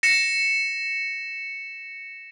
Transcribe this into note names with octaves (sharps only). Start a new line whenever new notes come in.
A#6 C#7 E7